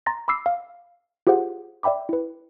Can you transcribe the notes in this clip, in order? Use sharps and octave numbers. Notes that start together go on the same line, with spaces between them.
A#5 C6 A6 A#6
B5 D6 E6 C7
F5
F4 G4 G#4 C5 F#5
D5 E5 G5 B5 D6
E4 B4